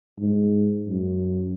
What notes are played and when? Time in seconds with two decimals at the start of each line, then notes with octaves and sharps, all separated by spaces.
0.18 G#2
0.88 F#2